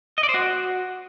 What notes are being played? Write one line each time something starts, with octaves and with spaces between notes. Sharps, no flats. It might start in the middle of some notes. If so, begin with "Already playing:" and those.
D#5
D5
C5
F#4